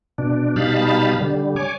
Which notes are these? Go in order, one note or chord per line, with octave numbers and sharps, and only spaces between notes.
B2 D4
B2 G3 D#4 F5 A5 B5
D3 G3
C#5 G#5 D6